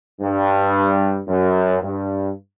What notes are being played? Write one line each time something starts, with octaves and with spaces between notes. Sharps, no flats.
G2
F#2
G2